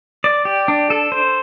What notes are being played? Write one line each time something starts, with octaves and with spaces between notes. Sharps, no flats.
D5
G4
D4
A4
C5